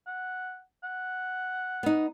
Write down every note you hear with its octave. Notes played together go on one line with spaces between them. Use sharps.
F#5
F#5
B3 D#4